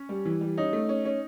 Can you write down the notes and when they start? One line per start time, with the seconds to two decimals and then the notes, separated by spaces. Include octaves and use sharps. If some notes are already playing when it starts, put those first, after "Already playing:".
Already playing: C#4
0.09 G3
0.25 E3
0.41 G3
0.57 C#4 D#4
0.73 A3
0.89 C#4
1.05 C#4